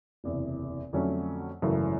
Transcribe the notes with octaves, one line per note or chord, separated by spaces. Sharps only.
F#1 E2 C3
F2 D3 F#3 A3 C#4
G#1 F#2 C#3 E3 A3